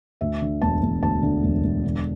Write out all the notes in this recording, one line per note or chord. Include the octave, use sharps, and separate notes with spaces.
D2 E5
D3
E1 A5
E1
D2 A5
D3
E1
E1
D3